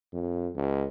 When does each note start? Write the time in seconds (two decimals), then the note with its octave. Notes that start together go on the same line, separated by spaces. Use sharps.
0.13 F2
0.56 C#2